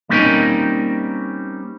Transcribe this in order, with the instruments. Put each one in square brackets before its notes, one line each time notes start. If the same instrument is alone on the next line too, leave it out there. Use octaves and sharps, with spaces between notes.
[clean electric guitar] G3 A#3 C4 C#4 D#4 A#4